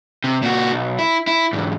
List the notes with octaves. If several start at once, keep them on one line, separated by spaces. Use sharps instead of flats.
C3
A#2 F#4
B1
E4
E4
E2 G#2